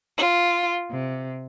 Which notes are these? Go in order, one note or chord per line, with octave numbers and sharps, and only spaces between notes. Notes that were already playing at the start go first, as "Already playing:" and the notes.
F4
C3